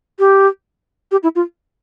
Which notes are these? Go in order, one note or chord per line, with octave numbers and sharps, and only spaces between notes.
G4
G4
E4
F4